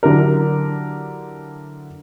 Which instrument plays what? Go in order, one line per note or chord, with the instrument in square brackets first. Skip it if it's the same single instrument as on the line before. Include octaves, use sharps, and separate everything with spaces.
[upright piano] D3 F#3 E4 G4 A#4